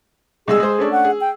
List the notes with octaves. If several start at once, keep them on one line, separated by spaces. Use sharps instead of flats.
C2 G#3 G#4 E6
G#3 C5
A3 C#4 D4
F#5
G#4
G5